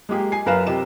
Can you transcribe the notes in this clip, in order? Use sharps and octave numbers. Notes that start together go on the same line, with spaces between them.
G#3 A#3 G4 G#4
G#5 C7
F#2 A#4 B4 F5 E7
C3 G4 D#5 E7